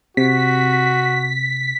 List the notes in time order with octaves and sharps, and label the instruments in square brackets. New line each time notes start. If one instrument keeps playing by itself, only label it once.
[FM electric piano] C3 [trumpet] F#4 [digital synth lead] B6